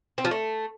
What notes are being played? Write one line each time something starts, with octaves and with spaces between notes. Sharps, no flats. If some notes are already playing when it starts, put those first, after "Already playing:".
C4
F3
A3